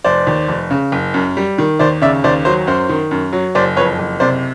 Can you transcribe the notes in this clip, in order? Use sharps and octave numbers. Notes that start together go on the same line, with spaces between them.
F1 C5 D5
D#2
F1
C#3
F#1
F#2
G3
D#3
D#2 C5 D5
C#3 D5 E5
D#2 C5 D5
F#3 C5
F#2 C5
D#3
F#2
F#3
F#1 C5 D5
F2 B4 C#5
F#1
C3 C5 D5